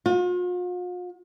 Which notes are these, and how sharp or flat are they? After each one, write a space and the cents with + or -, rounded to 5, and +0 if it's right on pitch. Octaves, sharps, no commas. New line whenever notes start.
F4 +45